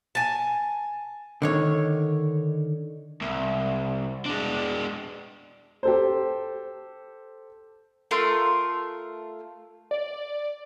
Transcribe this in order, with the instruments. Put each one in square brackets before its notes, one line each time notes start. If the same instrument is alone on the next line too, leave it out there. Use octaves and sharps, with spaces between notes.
[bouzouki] G#5 A5
[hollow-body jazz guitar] D3 D#3 C#5
[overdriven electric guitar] C2
G#3 D4
[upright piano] G4 A4 C5
[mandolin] A3 F4 A#4 C6
[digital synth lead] D5